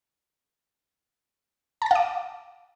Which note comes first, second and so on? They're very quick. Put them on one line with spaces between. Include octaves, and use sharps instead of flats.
A5 A6 F5 D6